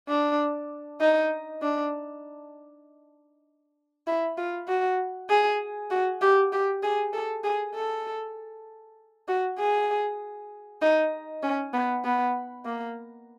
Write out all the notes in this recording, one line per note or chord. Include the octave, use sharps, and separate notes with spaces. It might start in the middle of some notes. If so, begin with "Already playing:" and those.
D4
D#4
D4
E4
F4
F#4
G#4
F#4
G4
G4
G#4
A4
G#4
A4
F#4
G#4
D#4
C#4
B3
B3
A#3